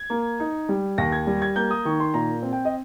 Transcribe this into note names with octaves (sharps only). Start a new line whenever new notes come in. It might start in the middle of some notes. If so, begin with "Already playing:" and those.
Already playing: G#6
A#3
D#4
G3
D#2 A#6
G#6
G3
G#6
A#3 G6
D#6
D#3 C#6
C6
A#2 A#5
C4
G5
D#5